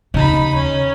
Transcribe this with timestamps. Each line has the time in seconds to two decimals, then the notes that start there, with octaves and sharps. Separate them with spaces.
0.14 D#2 C#3 D#4 B5
0.55 C#4